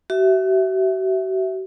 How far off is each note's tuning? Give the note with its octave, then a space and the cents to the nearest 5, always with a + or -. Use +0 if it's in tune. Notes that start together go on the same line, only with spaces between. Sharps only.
F#4 +45 E5 +0